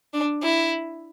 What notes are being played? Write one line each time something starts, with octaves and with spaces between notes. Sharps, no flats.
D4
E4